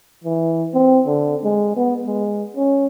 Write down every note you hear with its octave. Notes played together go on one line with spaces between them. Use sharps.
E3
C4
D3
G#3
B3
G#3
C#4